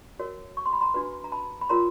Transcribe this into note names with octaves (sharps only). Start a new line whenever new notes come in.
F#4 A#4 C#5
C#6
C6
B5
A#5 C6
D4 F#4 B4
A#5
A5 B5
B5
F4 A#4 C#5 A#5 C6